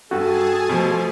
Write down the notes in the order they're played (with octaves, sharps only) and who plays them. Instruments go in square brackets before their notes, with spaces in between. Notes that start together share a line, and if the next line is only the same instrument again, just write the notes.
[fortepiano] G2 [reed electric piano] F#4 [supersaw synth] G#4 G#5 A5 [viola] A4
[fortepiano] B2 [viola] F3 A3